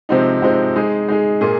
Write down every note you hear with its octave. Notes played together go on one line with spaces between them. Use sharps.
C3 F3 G#3 C4 D#4
C3 F3 G#3 C4 D#4
G#3 D#4 G#4
G#3 D#4 G#4
A#2 A#3 F4 G#4